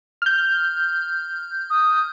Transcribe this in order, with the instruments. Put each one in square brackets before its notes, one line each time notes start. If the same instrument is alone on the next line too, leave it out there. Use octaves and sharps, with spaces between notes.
[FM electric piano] F6 G6
[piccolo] D#6